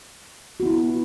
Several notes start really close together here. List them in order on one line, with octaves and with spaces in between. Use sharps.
F#4 B3 E4